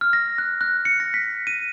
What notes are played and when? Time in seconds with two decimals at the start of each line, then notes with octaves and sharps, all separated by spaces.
0.01 F6
0.13 A#6
0.38 F#6
0.61 F#6
0.85 C#7
1.00 A#6
1.14 B6
1.47 D#7